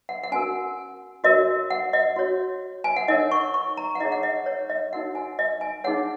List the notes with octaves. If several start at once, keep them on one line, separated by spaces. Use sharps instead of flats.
F#5
F#5
C#4 F#4 A#4 G#5
F#4 A#4 C#5 D#5
F#5
D#5
F#4 C#5
G#5
F#5
D#4 A#4 C#5 D#5
C#6
C#6
A#5
F#5
D#4 G#4 C#5 D#5
F#5
D#5
C#5
D#5
D#4 F#4 A#4 C#5 F#5
G#5
D#5
G#5
D#4 G#4 C#5 F#5